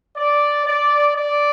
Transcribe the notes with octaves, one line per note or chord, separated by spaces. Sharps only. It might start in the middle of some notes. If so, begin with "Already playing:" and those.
D5
D5
D5